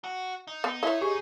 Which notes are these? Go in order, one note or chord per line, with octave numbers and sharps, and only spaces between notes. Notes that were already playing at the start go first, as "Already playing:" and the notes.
F#4
D#4
B3
E4 C#5 D#5
G4 G#4 C#6